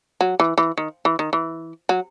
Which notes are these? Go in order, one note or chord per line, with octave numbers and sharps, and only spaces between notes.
F#3
E3
E3
D#3
E3
D#3
E3
F#3